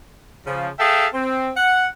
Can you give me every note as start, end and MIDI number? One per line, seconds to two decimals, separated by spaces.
0.47 0.70 49
0.47 0.70 53
0.80 1.08 68
0.80 1.08 69
0.80 1.08 76
0.80 1.08 77
0.80 1.08 79
1.14 1.51 60
1.57 1.87 78